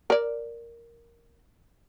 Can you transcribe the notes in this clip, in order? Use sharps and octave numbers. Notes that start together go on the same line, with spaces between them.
A#4 D5